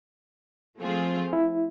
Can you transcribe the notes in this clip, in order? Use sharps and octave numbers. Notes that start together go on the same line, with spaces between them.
F3 A3 C4 F4 G#4
E4